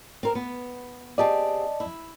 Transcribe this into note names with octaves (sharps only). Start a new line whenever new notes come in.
C4 A#4
B3
C4 G4 G#4 D5 D#5 A5
E4